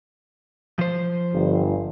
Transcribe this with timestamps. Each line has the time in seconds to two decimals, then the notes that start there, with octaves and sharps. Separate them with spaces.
0.79 F3 C5
1.34 G1